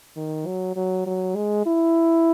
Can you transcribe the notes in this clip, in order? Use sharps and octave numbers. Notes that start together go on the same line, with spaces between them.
D#3
F#3
F#3
F#3
G#3
E4